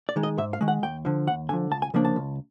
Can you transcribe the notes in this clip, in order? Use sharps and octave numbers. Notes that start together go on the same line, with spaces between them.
D5
D#3 G#3
D#5
G#2 E5
F5
D#3 G#3
F#5
D#2 G5
D3 F3
D#2 F#5
D3 F3 G#5
C#2 A5
G#5
C#3 F3 A#3 D4
A5
C#2